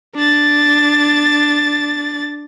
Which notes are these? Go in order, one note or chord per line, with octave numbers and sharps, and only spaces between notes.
D4 A6